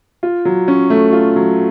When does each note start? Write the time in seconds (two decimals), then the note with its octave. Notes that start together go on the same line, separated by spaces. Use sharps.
0.23 F4
0.45 F#3
0.68 C#4
0.90 A3
1.13 F4
1.36 F#3